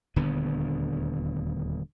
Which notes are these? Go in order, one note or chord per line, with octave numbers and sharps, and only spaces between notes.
D#1 D2 D3 B3